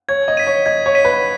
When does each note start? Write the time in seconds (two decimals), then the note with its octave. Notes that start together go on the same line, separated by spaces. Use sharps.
0.08 C#5 G#6
0.28 D#5
0.37 B6 D#7
0.47 C#5
0.66 D#5 G#6
0.86 C#5
0.95 B6 D#7
1.05 B4